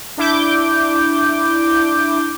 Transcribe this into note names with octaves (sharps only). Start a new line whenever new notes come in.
D4 E4 D6 G6